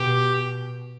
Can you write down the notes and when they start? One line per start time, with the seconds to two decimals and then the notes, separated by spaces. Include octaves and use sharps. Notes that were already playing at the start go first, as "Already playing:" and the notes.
Already playing: B2 G4